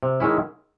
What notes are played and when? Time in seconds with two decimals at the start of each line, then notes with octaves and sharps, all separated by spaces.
0.03 C3
0.20 D#3 G#3 C#4 E4